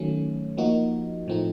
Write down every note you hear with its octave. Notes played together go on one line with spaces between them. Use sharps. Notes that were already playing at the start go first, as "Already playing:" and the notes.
Already playing: D#3 F#3 A3 C#4
F3 A#3 D#4 F#4
A2 F3 A3 C4 D#4